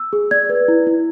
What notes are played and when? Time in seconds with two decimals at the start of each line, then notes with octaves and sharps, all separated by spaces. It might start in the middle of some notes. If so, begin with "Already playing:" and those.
Already playing: E6
0.13 G#4
0.31 D5 G#6
0.49 B4
0.68 E4
0.87 E4